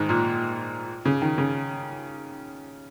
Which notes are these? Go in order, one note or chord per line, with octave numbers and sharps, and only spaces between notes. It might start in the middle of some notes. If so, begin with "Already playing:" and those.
Already playing: G#2 D#3
A#2
C#3
D#3
C#3